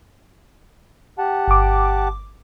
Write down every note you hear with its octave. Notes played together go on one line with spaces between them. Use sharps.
G4 F#5 A5
G1 D6